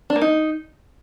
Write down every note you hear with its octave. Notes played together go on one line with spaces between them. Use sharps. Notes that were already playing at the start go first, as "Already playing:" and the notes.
D4
A#3
D#4